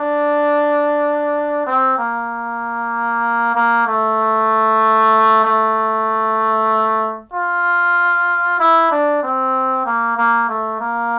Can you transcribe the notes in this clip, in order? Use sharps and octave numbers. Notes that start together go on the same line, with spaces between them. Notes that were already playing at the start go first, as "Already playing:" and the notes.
Already playing: D4
C4
A#3
A#3
A3
A3
F4
E4
D4
C4
A#3
A#3
A3
A#3